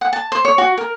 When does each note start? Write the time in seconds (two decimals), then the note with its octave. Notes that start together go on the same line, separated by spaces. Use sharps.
0.01 F#5
0.13 A5
0.32 C5
0.45 C#5
0.58 F#4
0.78 A#4